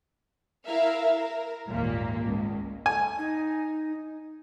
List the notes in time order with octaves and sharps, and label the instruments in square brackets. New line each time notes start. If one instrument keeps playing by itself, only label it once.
[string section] E4 A#4 E5 F5
A#4
G#1 D#2 A#2 A#3
C#2
[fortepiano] G#5
[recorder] D#4